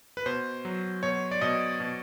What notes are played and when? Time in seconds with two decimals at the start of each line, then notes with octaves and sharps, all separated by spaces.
0.17 B4
0.26 B2 C5
0.65 F#3
1.03 B2 C#5
1.31 D5
1.41 B2 D#5
1.80 B2